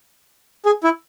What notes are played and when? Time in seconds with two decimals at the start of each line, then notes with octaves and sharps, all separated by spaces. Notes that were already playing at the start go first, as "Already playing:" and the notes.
0.66 G#4
0.84 E4